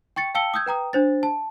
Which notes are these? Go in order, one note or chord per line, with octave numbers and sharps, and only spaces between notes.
G5 C#6 A6 C#7
F5 G5 A5 E6 C#7 G7
D#6 E6 G6 G#6
B4 G5 A#5 D#6
D4 C5 A6
A5